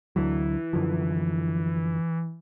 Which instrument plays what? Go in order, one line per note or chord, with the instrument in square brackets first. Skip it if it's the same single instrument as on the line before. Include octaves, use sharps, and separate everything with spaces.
[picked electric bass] D2 D3 F#3 [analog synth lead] E3
[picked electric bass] F#2 D3 F3